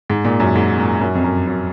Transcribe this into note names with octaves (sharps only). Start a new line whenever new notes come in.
G#2
A#2
F#2
G#2
A#2
F#2
F2
F#2
F#2